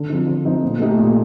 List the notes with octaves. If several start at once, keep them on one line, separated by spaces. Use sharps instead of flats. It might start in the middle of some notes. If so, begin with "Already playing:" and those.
Already playing: D3
F3 C4 D#4
D3
F3 C4 D#4
A#2
A3 D#4 G4
A#2